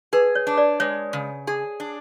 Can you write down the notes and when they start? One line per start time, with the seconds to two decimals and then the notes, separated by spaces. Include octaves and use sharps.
0.13 G#4 B4
0.35 C#5
0.47 D4
0.58 D5
0.80 G#3 C#5
1.13 C#3
1.47 G#4
1.80 D4